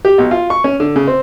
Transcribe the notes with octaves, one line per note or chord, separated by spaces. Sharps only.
G4
B1
F4
C#6
C#4
D3
C#3
C4